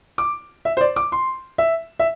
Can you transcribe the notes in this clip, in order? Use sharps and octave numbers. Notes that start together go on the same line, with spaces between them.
D6
E5
C5
D5
D6
C6
E5
E5